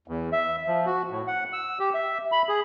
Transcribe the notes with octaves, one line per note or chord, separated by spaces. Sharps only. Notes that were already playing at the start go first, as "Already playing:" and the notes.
E2
E5
F3
F#4
A2
F#5
E6
G4
E5
B5
G#4